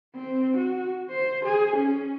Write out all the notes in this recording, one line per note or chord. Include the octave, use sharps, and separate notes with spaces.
C4
F#4
C5
G#4
C#4